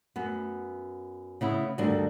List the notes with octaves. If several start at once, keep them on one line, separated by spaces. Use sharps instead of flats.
F#2 B3
C#3 B3 E4
D2 G2 D#3 D4 A4